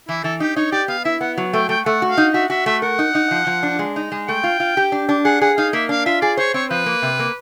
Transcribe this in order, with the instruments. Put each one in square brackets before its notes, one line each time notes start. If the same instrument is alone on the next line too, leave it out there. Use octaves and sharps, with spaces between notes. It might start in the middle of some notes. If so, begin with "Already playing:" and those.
[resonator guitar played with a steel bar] E3 [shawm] E4
[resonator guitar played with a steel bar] E3 [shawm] A4
[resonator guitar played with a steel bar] D#4 [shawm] G4
[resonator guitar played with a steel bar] D#4 [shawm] C#5
[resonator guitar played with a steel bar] G4 [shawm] D5
[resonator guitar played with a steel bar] B3 [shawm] F5
[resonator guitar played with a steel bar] E4 [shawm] E5
[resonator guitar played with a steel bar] B3 [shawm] F#5
[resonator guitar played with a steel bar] F#3
[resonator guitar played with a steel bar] A3 [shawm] G5
[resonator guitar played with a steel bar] A3 [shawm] G5
[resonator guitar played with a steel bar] A3 [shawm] F#5
[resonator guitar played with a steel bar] F#4
[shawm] F5
[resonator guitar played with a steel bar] D#4
[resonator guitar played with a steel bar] F#4 [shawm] E5
[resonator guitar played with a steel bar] F#4 [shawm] E5
[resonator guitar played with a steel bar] A3 [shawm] E5
[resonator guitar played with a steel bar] A#4 [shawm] F#5
[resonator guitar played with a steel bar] D#4
D#4
F3
F3
D4
G#3
D#4
G#3
[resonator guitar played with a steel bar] A3 [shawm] G5
[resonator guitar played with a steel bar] F4
F4
G4
D4
D4
[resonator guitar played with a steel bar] G#4 [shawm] F#5
[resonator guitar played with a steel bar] G#4 [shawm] F#5
[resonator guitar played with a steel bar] D#4 [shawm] F5
[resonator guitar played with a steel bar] A#3 [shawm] E5
[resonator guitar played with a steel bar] D4 [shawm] F5
[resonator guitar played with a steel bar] F4 [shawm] E5
[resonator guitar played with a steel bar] G#4 [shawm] D5
[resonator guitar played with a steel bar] C5 [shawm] C#5
[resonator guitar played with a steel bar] C4 [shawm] C#5
[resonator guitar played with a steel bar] F3 [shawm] B4
[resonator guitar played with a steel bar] A#3
C3
A#3